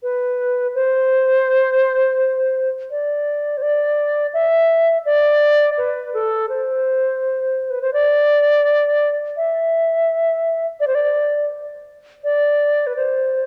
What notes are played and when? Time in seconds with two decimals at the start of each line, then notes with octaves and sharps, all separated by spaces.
0.03 B4
0.75 C5
2.91 D5
3.57 C5
3.62 D5
4.34 E5
5.06 D5
5.78 B4
6.14 A4
6.49 C5
7.70 B4
7.82 C5
7.93 D5
9.37 E5
10.80 D5
10.87 C5
10.95 D5
12.24 D5
12.87 B4
12.96 C5